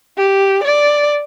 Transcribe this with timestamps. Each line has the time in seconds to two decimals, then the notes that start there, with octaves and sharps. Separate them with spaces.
0.17 G4
0.64 D5